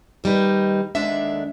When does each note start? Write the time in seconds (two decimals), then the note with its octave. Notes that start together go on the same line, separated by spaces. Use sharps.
0.24 D#2 G3 D#4 B4
0.95 D#2 D3 G#3 D4 E5